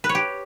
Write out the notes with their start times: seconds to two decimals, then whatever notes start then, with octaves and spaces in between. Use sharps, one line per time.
0.04 B4
0.09 C#5
0.15 G4